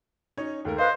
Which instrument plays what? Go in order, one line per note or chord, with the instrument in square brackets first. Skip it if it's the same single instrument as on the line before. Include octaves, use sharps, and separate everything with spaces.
[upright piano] C#4 D#4 C#5
D#2 A3 A#4
[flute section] B4 F5 [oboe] C5 [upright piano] D#5